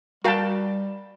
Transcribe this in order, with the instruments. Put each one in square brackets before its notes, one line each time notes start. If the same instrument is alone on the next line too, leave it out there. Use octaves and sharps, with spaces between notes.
[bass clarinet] G3 [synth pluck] F#4 F5 [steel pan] A#4 G5 A5